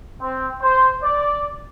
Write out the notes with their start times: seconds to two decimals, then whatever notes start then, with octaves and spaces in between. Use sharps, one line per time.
0.21 C4
0.62 C5
1.03 D5